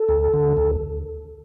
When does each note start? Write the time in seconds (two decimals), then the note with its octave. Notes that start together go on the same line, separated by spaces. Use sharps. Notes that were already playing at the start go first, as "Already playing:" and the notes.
Already playing: A4
0.09 D2
0.33 D3
0.57 D2